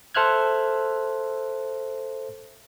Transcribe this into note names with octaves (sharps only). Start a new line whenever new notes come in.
A4 C5 E5 F6 F#6 G#6